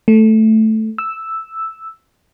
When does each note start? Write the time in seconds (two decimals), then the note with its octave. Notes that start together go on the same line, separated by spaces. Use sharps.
0.08 A3
0.98 E6